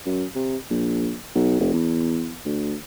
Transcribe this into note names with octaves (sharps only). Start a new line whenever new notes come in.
F#2
C3
A#1
B1
F1
E2
D2